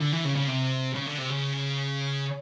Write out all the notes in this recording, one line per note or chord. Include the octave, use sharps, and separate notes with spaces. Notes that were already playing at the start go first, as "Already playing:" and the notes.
D3
E3
C#3
C#3
C3
C#3
D3
C3
C#3